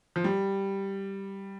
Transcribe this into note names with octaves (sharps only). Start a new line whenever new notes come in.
F3
G3